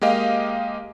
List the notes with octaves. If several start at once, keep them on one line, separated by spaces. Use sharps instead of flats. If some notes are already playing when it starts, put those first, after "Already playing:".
G#3 A#3 G4 D#5 F5